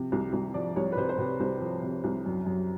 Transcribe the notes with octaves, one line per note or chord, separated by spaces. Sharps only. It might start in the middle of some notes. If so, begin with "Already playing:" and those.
Already playing: C3 F3
C2
C2
F3 D5
C2 C#5
B4
C3 C5
C5
C3 B4
C2 C5
F3
C3
C2
F#2
F#2